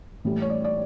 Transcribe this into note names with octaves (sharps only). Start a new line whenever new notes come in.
A2 E3 G3
C#5
D5
D5